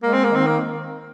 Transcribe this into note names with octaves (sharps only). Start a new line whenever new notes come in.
G#3 A#3
C4
A#3
D#3 C4
A#3